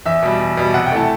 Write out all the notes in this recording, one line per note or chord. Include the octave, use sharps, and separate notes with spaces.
E2 E5
B2 G3
E2
B2 G3
C3 F#5
G5
E3 A3 A5